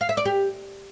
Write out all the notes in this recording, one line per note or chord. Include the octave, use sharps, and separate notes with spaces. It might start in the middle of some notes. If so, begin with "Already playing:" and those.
F5
E5
D5
G4